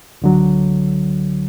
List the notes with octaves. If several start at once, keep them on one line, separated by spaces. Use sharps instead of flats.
C#2 D3 F#3